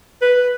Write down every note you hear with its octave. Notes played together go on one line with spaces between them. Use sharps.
B4